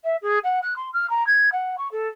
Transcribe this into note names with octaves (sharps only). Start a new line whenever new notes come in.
E5
G#4
F#5
F#6
C6
F6
A#5
G#6
F#5
C#6
A4